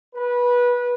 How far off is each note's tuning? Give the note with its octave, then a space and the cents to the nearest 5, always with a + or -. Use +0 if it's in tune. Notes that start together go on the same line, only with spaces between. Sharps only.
B4 -20